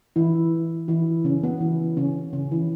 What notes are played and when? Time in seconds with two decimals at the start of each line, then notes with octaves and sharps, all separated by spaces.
0.16 E3 E4
0.88 E3 E4
1.24 C#3 C#4
1.43 B3
1.61 E3 E4
1.97 C#3 C#4
2.33 C#3 C#4
2.51 E3 E4